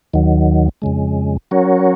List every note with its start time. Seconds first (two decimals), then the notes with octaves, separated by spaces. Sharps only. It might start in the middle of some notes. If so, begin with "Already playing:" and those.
0.14 D#2 D#3 F#3
0.82 F2 C#3 G#3
1.51 F#3 C#4 F#4 A#4 C#5